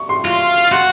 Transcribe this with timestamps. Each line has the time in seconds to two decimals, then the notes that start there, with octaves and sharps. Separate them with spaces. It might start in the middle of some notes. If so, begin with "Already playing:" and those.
Already playing: C#6
0.09 C6
0.25 F4
0.72 F#4 C6